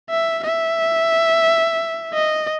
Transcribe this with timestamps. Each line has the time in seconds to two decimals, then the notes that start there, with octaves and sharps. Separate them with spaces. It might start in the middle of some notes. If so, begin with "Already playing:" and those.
0.10 E5
0.44 E5
2.14 D#5